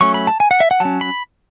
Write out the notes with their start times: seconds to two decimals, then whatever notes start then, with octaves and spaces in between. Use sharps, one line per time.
0.01 F#3 A3 C#4 C#6
0.14 B5
0.27 A5
0.40 G#5
0.51 F#5
0.60 E5
0.71 F#5
0.80 F#3 C#4 A5
1.01 B5